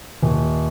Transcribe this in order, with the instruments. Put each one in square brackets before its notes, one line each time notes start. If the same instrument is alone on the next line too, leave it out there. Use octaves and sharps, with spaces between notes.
[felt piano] D#1